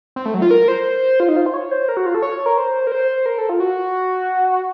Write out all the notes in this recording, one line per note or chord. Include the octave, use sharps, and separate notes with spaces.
C4
A3
F#3
F4
A#4
C5
F4
D#4
F4
C5
C#5
C5
A#4
F#4
F4
A4
C#5
A#4
C5
A#4
C5
A#4
A4
F4
F#4